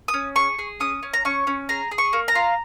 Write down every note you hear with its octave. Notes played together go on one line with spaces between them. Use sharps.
D#6
C#4
G#4 C#6
G#4
C#4 D#6
C#4
A#5
C#4 C#6
C#4
G#4 A#5
G#4
C#6
A#3
A#5
F4